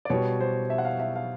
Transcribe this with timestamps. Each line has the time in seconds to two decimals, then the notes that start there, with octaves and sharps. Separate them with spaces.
0.05 D5
0.10 B2 G3 C#5
0.40 C5
0.70 E5
0.78 F#5
0.85 F5
1.00 E5
1.15 F5